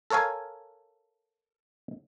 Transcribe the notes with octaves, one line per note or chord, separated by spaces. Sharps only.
A4 A#4 C#5 F5 G#5